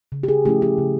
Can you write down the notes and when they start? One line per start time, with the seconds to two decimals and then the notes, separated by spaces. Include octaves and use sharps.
0.12 C#3
0.23 G4
0.28 G#4
0.45 F3 A3 C#4 E4 G4
0.62 G4
0.78 C#3